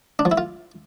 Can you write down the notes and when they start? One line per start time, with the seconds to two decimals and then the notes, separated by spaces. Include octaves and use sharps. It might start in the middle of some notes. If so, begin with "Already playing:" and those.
0.19 D4
0.25 F3
0.31 E4
0.38 F4